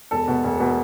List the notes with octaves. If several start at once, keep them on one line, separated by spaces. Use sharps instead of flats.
E1 A4
B2
E1
B2